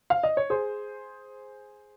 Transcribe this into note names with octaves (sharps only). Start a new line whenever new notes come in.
F5
D#5
C#5
G#4 C5